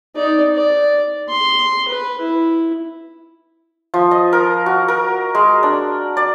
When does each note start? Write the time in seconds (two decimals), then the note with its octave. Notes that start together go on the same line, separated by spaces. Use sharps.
0.15 D#4 D5
0.55 D5
1.30 C6
1.88 B4
2.21 E4
3.94 F3
4.11 D#5
4.33 A#4
4.66 F#4
4.88 A#4
5.35 G#3
5.63 D4
6.17 D5